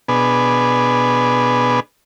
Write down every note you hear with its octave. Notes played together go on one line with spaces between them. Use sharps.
B2 B3 D4 G#4